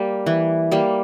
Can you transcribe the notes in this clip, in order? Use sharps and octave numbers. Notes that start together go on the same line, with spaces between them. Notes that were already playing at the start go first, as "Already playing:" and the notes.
Already playing: G3 A#3
E3
G3 A#3